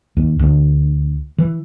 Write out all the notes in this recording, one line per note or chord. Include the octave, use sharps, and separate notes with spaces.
D#2
D2
E3